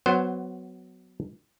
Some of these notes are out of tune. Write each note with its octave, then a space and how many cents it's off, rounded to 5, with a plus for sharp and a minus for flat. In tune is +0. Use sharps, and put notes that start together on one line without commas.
F#3 +0 B3 +20 C5 +0